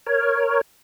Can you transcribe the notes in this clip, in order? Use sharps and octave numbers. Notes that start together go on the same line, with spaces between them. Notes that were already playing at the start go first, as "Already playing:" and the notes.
A#4 C#5